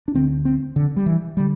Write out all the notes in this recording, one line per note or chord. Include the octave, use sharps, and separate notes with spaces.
D4
D2 D3 C4
C4
D3
G3
E3
D3 G3